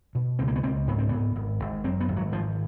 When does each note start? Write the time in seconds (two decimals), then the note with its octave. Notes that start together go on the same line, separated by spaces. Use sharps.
0.15 B2
0.39 C#2 C4
0.48 A#3
0.56 B3
0.63 C#2 C4
0.88 G#2 B3
0.98 C4
1.09 G#2 B3
1.36 G#1
1.60 G#1
1.84 F#2 C4
2.00 B3
2.08 G#1
2.16 F#3
2.32 G#1 F3